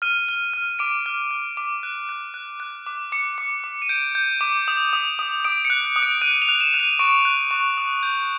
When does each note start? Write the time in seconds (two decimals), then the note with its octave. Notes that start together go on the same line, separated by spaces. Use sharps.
0.02 F6 D#7
0.29 F6
0.53 F6
0.79 D6 D7
1.06 F6
1.31 F6
1.57 D6
1.83 F#6
2.09 F#6
2.34 F#6
2.60 F#6
2.86 D6
3.12 D6 C#7
3.38 D6
3.64 D6
3.82 D#7
3.89 G6 D7
4.15 G6
4.41 D6
4.68 D#6
4.93 D#6
5.19 D#6
5.44 D#6 D7
5.65 C#7
5.70 F#6
5.96 D#6
6.03 D7
6.22 F#6 D#7
6.42 F7
6.49 F#6
6.61 E7
6.74 F#6
6.80 D#7
6.99 C#6 D7
7.25 F#6
7.51 C#6
7.77 D#6
8.03 G6